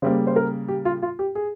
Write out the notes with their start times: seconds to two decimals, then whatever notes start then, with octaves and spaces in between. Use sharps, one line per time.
0.02 C#3 G3 A#3 C5
0.27 C5
0.36 A#4
0.68 G4
0.85 F4
1.02 F4
1.19 G4
1.35 G#4